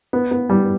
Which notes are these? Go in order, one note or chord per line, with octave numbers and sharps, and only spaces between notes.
B3
B3
G3